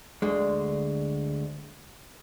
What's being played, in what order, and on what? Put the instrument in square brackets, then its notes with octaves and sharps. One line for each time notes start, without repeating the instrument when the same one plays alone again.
[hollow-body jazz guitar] D2 D3 G#3